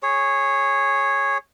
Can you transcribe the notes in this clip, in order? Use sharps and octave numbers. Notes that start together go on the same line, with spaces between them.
G#4 C#5